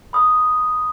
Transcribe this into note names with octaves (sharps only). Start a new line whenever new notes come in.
B5 D#6